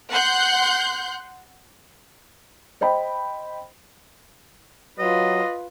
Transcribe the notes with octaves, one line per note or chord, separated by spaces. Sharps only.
F#5 C6 F#6 G6
C5 D#5 G5 B5
F#3 F4 B4 D#5